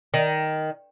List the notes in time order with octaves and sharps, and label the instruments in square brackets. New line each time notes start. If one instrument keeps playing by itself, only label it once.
[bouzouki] D#3